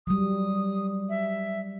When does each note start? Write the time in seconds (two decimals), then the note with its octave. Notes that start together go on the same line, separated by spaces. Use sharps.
0.07 F#3 G3 D#6
1.09 E5